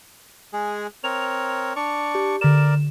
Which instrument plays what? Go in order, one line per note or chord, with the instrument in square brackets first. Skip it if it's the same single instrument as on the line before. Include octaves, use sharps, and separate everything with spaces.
[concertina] G#3 G#4
[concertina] C4 A#4 C#5 [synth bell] F7
[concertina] D4 D5 C#6
[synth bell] G4
[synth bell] D3 E7 [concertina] A#4 D5